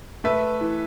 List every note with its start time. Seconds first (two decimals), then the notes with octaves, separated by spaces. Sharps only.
0.24 A3 B4 E5
0.61 E3